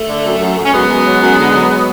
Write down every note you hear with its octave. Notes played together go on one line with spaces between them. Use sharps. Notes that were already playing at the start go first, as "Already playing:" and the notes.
Already playing: A3
D3
F#2
F#2
F#2
C#4
F#2 G#3 B3
F#2
F#3
F#2
D3
F#3
F#3